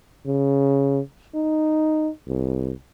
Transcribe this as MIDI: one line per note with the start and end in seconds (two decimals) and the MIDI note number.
0.26 1.00 49
1.35 2.09 63
2.27 2.71 36